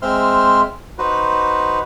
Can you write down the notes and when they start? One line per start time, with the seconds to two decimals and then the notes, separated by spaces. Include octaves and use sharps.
0.02 G#3 C4 C5 E5 C6 F6
0.98 D#4 F#4 B4 C5